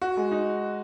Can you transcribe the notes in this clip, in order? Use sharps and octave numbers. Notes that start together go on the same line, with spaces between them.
F#4
G#3
D#4